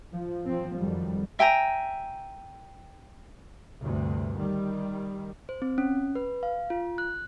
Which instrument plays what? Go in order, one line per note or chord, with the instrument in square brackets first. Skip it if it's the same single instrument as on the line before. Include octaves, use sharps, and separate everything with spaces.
[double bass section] F3
F3 C4
F2 D#3 F#3 G3
[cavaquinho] E5 G5 G#5 A#5
[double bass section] D2 G2 C3
D#3 G3
[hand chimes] C5
C4
C#4
B4
F5
F4
F#6